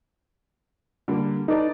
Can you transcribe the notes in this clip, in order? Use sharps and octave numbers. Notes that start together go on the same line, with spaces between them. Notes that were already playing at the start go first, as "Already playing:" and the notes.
D3 G3 A#3
D#4 A4 B4 D5